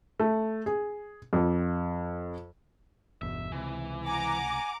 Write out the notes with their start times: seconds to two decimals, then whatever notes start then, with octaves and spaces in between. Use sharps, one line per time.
0.20 A3
0.66 G#4
1.33 F2
3.22 G1 E2 B2 E5
3.52 C#2 C3 E3
4.06 F#5 G#5 A#5 D6